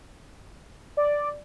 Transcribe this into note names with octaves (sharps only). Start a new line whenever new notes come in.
D5